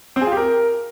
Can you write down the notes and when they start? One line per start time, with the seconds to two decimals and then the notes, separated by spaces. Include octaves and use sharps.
0.16 C4
0.21 G#4
0.27 F4
0.32 G4
0.37 A#4